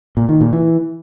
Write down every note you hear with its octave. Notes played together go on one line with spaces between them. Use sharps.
A#2
D#3
A#2
E3